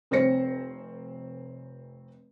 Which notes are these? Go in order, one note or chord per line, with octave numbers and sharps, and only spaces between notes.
F1 C4 C5 C#5 A#6 C#7